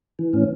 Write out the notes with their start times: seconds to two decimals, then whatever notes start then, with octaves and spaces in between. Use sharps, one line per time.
0.19 E3
0.33 A2 C#4